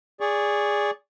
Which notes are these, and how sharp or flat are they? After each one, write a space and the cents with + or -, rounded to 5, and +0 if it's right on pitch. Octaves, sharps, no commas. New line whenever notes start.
G#4 -10 D5 -15 C#6 +0